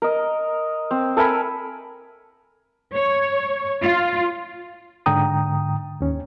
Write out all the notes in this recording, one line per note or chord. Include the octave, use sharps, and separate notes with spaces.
A#4 D#5
C4
A4 A#4 G#5 B5
C#5
F4
G#2 D3 G5 A#5 D#6
D#2 C#4